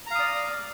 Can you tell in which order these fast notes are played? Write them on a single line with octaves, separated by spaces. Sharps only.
A#5 F5 D#6 D5